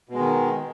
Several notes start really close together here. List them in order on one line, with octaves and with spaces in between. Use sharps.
B2 G#3 D#3